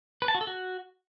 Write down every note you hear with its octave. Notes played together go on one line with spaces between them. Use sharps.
B4
A5
F#4
A4
F#4